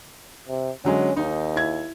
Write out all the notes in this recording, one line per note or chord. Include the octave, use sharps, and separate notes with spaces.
C3
D3 F#3 G#3 C#4
D#2 D#4
E4 G#6